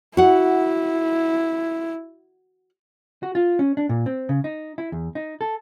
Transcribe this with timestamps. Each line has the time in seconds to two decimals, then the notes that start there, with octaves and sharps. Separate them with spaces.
0.17 E4 F#4 F#5
3.23 F#4
3.35 F4
3.59 C#4
3.77 D4
3.89 A#2
4.06 C4
4.29 C#3
4.44 D#4
4.78 E4
4.92 E2
5.15 D#4
5.41 A4